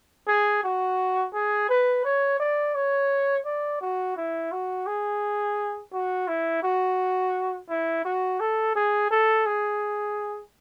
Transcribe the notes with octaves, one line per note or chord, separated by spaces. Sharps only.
G#4
F#4
G#4
B4
C#5
D5
C#5
D5
F#4
E4
F#4
G#4
F#4
E4
F#4
E4
F#4
A4
G#4
A4
G#4